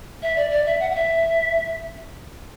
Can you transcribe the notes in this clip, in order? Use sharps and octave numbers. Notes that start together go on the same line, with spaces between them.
E5
D5
D5
E5
F#5
F#5
E5